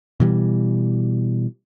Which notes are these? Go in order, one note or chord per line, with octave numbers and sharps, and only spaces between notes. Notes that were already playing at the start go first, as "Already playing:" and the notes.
B2 E3 G3